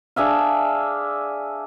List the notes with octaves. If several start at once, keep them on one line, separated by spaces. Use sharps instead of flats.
D4 G#4 E5 F5